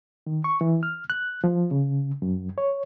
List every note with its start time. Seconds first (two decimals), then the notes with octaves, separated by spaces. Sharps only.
0.27 D#3
0.44 C#6
0.61 E3
0.83 F6
1.10 F#6
1.44 F3
1.71 C#3
2.22 F#2
2.58 C#5